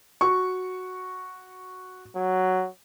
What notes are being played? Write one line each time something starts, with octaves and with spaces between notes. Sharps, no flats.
F#4 C#6
F#3